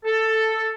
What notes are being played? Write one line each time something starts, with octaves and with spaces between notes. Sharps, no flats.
A4